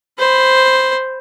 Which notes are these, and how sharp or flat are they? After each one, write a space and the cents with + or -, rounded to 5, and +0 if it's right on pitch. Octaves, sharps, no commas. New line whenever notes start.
C5 +0 B5 +10